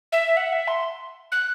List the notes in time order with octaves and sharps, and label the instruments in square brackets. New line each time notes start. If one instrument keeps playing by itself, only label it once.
[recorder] E5
F#5
E5
C6
F#6